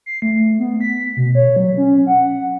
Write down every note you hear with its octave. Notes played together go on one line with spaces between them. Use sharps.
C7
A3
B3
B6
B2
C#5
F#3
C#4
F#5